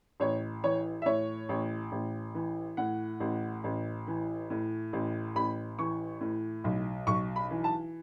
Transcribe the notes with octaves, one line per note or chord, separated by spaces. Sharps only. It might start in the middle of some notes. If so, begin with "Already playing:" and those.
A1 C#5
E3 C#5
E5
A2 C#5
A1
A1
E3
A2 F#5
A1
A1
E3
A2
A1
A1 B5
E3 C#6
A2
B1
B1 C#6
B5
E3
A5